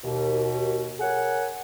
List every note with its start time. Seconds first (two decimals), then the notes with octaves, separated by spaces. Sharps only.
0.04 D#2 B2
1.00 G#4 A#4 C#5 F#5